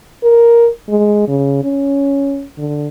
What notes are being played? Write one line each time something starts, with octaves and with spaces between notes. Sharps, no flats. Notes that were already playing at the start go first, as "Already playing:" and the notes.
A#4
G#3
C#3
C#4
D3